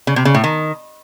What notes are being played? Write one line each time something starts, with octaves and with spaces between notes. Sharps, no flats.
C#3
C3
C#3
A2
D#3